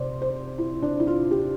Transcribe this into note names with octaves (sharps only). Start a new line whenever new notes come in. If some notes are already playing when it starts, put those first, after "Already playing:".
Already playing: C3 C5 D5
C5
E4
D4
E4
F4
G4